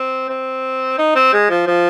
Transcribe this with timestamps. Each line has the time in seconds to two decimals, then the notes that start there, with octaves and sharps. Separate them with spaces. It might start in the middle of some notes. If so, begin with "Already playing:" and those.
Already playing: C4
0.29 C4
0.98 D#4
1.15 C4
1.33 G#3
1.50 F3
1.67 F3